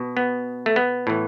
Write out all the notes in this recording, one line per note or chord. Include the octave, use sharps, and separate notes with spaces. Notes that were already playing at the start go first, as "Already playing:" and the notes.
Already playing: B2
B3
A3
B3
A2 E3